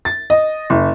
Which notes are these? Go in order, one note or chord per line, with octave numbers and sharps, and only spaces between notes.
A6
D#5
F#1